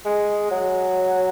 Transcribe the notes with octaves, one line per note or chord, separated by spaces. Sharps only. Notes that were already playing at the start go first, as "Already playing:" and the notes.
G#3
F#3